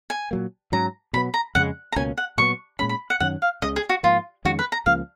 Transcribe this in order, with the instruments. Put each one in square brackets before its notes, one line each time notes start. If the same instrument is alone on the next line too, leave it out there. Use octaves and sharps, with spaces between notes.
[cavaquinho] G#5
[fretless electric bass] A#2 F#3 A#3
[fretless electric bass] G#2 F#3 C#4 [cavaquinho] A#5
[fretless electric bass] B2 F#3 B3 [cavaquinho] B5
[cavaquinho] A#5
[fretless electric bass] F2 C#3 G#3 [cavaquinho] F#5
[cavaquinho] A#5
[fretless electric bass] C#2 B2 A#3 C#4 [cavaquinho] G#5
[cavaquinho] F#5
[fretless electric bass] A#2 F#3 B3 [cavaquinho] C#6
[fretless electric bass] A#2 G#3 C#4 [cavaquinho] B5
[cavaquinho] B5
F#5
[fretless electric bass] F#2 D#3 A#3 C#4 [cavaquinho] F#5
[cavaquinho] F5
[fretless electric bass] C#2 C#3 G#3 [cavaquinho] D#5
[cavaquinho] G#4
F#4
[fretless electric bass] G#2 F3 A#3 [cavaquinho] F4
[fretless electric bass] F2 D#3 G#3 C#4 [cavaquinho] F#4
[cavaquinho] B4
A#5
[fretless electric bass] C#2 C#3 F3 A#3 [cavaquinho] F5